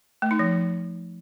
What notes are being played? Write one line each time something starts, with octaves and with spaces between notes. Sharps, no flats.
A3
D#4
F3